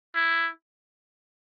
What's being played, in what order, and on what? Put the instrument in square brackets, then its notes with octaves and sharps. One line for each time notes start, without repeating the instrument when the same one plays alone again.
[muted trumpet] E4